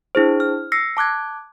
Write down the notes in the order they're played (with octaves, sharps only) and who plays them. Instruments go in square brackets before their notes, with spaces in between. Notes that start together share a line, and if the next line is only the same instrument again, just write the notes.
[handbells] D4 E4 G#4 C5
F6
E6 A#6 C7 C#7
A5 D6 F#6 G#6